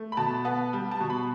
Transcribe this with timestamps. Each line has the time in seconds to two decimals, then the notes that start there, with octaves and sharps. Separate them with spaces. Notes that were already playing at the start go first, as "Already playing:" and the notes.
Already playing: A3
0.12 B5
0.17 B2 A5
0.45 B3
0.73 G3
0.91 A5
1.00 B2
1.10 B5